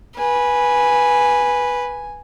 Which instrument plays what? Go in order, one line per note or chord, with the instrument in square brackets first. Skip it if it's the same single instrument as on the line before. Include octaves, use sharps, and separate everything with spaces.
[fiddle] B4 [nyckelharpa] G#5